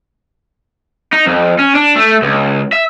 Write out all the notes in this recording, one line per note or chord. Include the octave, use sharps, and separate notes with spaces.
D#4
F2
C#4
D4
A3
C#2
E5